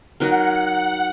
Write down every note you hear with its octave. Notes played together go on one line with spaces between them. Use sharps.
F#3 D#4 A#4 F#5